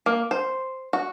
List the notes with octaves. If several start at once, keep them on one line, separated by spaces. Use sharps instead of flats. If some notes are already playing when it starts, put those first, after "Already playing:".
A#3
C5
F#4